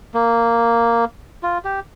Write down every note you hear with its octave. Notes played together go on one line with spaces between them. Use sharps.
A#3
F4
G4